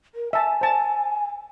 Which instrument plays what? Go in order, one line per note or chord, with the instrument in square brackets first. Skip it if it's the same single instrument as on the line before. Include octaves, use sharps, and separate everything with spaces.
[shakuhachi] A#4
[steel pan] E5 A5 [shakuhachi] G#5
[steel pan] C5 A5